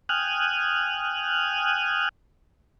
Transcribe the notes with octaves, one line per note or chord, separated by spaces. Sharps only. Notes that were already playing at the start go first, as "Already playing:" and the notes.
G5 G#5 D#6 F6 F#6